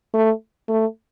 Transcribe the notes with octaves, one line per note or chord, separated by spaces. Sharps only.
A3
A3